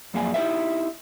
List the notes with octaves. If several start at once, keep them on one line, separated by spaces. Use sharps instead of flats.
F#2 F3 A#3 G#4 D5 G#5
D#4 E4 G4 B4 D5 E5